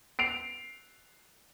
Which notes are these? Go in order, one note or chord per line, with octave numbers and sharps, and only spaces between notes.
C7 D7 F7